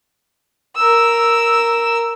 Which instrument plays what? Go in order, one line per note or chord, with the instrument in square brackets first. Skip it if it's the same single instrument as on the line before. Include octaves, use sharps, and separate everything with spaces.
[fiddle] A#4 E6